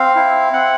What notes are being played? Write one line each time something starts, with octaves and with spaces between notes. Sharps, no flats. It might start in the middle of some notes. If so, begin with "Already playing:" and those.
Already playing: C4 F5
E4
C4 F#5